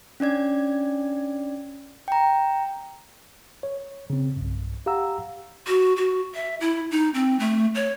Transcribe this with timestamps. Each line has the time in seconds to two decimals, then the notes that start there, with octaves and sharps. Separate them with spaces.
0.20 C#4 D4 D5 G#6
2.08 G5 A#5
3.63 C#5
4.10 C#3 C4
4.36 B1 G2
4.86 G4 F5 F#5 A#5 E6
5.67 F#4
5.97 F#4
6.34 E5
6.61 E4
6.91 D#4
7.14 C4
7.40 A3
7.75 C#5